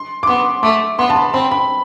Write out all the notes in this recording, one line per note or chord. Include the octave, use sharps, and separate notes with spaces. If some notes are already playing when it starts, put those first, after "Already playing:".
Already playing: C6
D6
B3 C6
A3 D6
B3 C6
A5
B5
C4 B5
B5